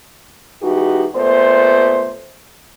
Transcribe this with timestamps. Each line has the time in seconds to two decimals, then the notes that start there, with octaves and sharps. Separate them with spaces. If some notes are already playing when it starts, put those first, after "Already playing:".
0.62 E3 G#3 D#4 F#4 G4
1.14 A#2 A3 B3 C5